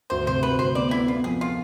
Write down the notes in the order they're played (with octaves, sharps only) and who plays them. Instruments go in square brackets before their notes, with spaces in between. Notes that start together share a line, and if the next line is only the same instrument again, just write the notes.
[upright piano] D2 [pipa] C5
[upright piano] C3 [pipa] C5
[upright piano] D2 [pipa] B4
[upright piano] D2 [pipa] C5
[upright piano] B3 [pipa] D5
[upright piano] B3 [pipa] E4
[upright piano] B3 [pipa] F4
[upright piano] F2 [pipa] G#4
[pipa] F4